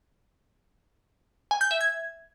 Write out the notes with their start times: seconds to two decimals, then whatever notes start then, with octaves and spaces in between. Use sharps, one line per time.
1.51 G#5
1.61 G6
1.71 E5
1.81 G#6